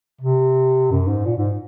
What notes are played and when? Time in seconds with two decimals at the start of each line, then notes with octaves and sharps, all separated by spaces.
0.21 C3
0.91 F#2
1.08 G#2
1.25 A#2
1.37 G#2